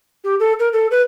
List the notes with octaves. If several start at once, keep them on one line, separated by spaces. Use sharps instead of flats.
G4
A4
A#4
A4
B4